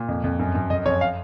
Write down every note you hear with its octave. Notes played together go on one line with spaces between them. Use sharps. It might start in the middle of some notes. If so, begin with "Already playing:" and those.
Already playing: A#2
F2
F2
F#2
F#2
F2 D#5
F2 C#5
F5